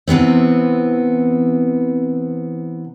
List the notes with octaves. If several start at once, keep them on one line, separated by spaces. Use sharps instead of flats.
C3 E3 B3 C4